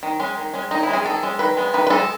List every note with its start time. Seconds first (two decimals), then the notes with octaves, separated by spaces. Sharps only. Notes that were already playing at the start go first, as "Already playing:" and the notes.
0.03 D#3
0.20 G#3 C#4
0.37 D#3
0.54 G#3 C#4
0.71 D#3 D#4
0.83 E4
0.89 G#3 C#4 G#4
1.05 D#3 A4
1.23 G#3 C#4
1.39 D#3 B4
1.57 G#3 B3
1.74 D#3 B4
1.87 B4
1.90 G#3 B3 A4